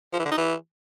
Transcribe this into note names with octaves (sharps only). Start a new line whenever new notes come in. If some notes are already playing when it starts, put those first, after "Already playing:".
F3
E3
D3
D#4
E3